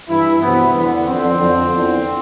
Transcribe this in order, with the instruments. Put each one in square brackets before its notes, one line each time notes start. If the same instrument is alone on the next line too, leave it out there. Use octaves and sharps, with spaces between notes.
[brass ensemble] G2 E3 E4
D2 C3 E3 B3
E2 D3 B3
F2 D3 C4
F2 D3
E2 D3